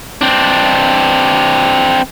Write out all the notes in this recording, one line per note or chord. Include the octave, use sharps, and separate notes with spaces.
C4 D4